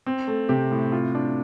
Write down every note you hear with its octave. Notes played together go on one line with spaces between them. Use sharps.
C4
A3
C3 G4
A2
F4
D4